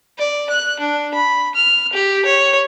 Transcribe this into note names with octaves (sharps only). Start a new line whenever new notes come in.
D5
F#6
D4
B5
F6
G4
C#5